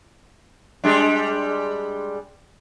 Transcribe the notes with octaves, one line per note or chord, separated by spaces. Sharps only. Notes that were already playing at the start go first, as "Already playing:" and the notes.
G3 G#3 D4